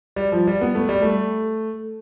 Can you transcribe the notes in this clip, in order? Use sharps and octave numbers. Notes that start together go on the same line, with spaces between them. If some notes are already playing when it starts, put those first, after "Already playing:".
G3
F3
G3
B3
A3
G3
A3